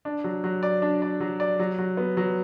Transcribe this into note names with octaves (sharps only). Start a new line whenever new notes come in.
D4
F#3
F#3
D5
D4
D5
F#3
D5
F#3
F#3
B3
F#3